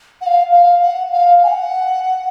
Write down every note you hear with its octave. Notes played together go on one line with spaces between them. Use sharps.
F#5
F5
F5
F#5
F5
G#5
F#5